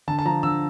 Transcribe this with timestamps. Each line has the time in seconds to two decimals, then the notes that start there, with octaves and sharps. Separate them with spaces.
0.08 D3 A5
0.19 A5
0.25 F3 A#5
0.43 D3 E6